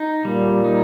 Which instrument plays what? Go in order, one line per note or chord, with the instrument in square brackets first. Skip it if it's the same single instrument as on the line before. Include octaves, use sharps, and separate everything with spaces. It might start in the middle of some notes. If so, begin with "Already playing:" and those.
Already playing: [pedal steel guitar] D#4
[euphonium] A#2 [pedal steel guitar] G3
[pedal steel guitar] D#4